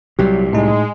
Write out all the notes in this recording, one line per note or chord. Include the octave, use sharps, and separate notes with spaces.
C2 A#2 F#3 G3 G4
A2 G#3 D#4